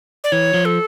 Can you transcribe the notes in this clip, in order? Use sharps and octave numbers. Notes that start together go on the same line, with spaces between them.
D5
E3 C#5
F3
A4